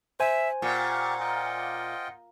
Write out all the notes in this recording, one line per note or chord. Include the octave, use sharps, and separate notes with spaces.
C5 E5 G#5
A#2 G4 F5 F#5 C#6
F4 D#5 G5